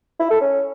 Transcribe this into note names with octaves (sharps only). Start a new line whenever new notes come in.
E4
A4
C#4